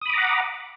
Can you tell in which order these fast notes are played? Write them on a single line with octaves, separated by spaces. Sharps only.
D#6 B5 D6 A#5 F#5